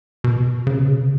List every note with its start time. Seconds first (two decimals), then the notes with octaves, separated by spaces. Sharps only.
0.24 B2
0.67 C#3
0.78 B2
0.89 C#3